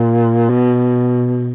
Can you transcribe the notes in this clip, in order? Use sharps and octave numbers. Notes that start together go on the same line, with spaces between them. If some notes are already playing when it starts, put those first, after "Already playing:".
Already playing: A#2
B2